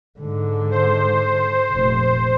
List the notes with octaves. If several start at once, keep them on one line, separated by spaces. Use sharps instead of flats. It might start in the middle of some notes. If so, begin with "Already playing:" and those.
G#2 D3
C5
F1 A#2